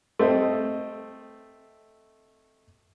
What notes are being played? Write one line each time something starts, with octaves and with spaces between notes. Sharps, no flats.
A3 C4 D#5